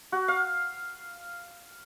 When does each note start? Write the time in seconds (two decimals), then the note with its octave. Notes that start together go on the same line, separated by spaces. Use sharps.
0.12 F#4
0.28 F5